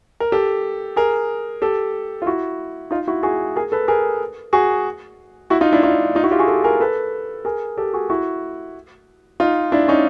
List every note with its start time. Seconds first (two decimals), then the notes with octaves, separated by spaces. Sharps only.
0.20 A#4
0.32 G4 A4
0.96 G#4 A#4
1.62 G4 A4
2.22 F4
2.26 E4 F#4
2.91 D#4 F4
3.07 E4 F#4
3.23 F#4 G#4
3.56 G#4 A#4
3.72 A4 B4
3.88 G#4 A#4
4.53 F#4 G#4
5.50 E4 F#4
5.61 D#4 F4
5.72 D4 E4
5.83 D#4 F4
6.15 D#4 F4
6.24 E4 F#4
6.31 F4 G4
6.39 F#4 G#4
6.48 G4 A4
6.64 G#4 A#4
6.80 A4 B4
7.45 G#4 A#4
7.77 G4 A4
7.93 F#4 G#4
8.10 E4 F#4
9.40 D#4 F4
9.72 D4 E4
9.88 C#4 D#4